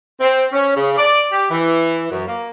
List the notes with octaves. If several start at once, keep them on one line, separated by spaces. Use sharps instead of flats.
C4
C#4
C#3
D5
G4
E3
F#2
A#3